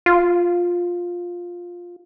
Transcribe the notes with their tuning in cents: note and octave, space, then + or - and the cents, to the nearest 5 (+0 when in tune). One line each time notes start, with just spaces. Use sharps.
F4 +10